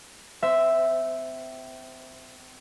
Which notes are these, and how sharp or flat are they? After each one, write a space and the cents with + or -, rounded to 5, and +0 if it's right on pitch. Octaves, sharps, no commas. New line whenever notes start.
C4 -35 C5 -10 E5 +0